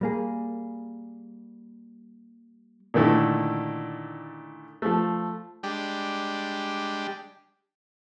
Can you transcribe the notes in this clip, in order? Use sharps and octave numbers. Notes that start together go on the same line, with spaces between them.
G3 A#3 G#4
A#2 D3 D#3 A3 E4
F3 A3
G3 G#3 D4 G4